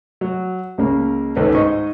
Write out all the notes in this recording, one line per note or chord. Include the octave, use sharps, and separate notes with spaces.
F#3
C#2 C#3 A#3
C#2 D#3 C#4 A4 B4 D#5
G#2 D#4 C5 D#5 C#6